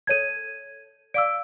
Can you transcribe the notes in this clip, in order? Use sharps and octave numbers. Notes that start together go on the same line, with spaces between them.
A4 C#5 A5 G#6 D#7
D5 F5 D6 E6 D7